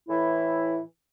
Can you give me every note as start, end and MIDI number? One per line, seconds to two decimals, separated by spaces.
0.09 0.79 45
0.09 0.79 52
0.09 0.79 64